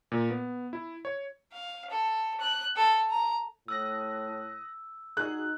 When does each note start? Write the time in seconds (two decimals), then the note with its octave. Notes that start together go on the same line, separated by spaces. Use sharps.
0.12 A#2
0.30 B3
0.73 E4
1.05 C#5
1.52 F5
1.90 A4
2.40 F#6
2.76 A4
3.10 A#5
3.68 A2 D#6 E6 F#6 A#6
5.17 D#4 F#4 G#4 F#6